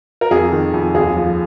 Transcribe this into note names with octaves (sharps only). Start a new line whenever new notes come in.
A#4
F2 G#4
D#3
F2
D#2 G#4
F3